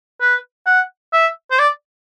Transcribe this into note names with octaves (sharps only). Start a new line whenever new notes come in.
B4
F#5
E5
C5
D5